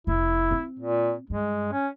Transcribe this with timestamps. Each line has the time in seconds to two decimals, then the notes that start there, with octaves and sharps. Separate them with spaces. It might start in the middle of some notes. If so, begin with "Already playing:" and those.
0.07 F1 E4
0.51 C4
0.79 A#2
1.30 G2 G#3
1.72 C#4